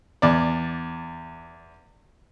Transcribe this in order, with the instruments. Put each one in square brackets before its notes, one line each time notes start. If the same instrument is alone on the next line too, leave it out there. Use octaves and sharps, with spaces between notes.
[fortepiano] E2 D5